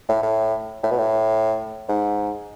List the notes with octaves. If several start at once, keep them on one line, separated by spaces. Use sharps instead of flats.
A2
A2
A2
B2
A2
G#2